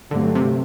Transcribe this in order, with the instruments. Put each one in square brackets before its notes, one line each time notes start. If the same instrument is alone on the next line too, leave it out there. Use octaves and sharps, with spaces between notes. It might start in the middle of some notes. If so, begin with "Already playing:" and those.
[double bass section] G2 F#3 A3 C4 [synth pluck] D3
[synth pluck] C3